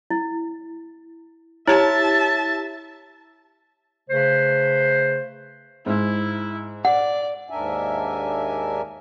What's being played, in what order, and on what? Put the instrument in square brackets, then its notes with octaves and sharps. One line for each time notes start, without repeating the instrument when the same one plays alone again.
[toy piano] E4
[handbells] E4 G4 [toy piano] C#5 A#5 [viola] E5 A5
[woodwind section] C#3 A3 B4 C5
[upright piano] G#2 [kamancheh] E4
[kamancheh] D5 [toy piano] F#5
[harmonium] D#2 G#2 D4 A#4 E5 G#5